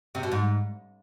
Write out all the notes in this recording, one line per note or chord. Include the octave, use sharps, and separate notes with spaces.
C3
B2
G#2